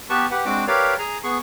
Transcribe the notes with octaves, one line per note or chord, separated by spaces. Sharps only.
B3 G4 B4 A5 C#6
G4 B4 F#5
G#3 C4 D4 F#4 D6
G4 A#4 B4 C#5 D5 F5
G#4 G#5 A#5
B3 G#4 C#6